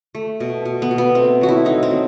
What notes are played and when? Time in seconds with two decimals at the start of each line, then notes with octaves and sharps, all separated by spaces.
0.15 A3
0.40 B2
0.65 B2
0.82 B3
0.91 B2
0.98 B3
1.15 A3 C4
1.41 F#3 F#4
1.49 E4
1.65 A3 D#4
1.83 C4
1.91 F#3